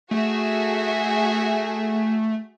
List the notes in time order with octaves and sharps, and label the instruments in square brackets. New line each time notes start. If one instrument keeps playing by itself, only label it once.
[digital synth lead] A3 [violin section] F#4 G#4 E5